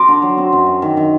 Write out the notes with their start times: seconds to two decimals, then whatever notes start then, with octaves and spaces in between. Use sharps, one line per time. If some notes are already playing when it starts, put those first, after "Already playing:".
Already playing: C4 A#5 C6 D6
0.08 D3
0.22 F#3
0.38 C4
0.53 F#2
0.66 F#2
0.82 D#3
0.97 D#3